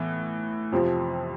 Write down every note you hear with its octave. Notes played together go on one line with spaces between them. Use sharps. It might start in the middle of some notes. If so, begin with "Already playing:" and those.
Already playing: A2 E3 B3
F2 C3 F3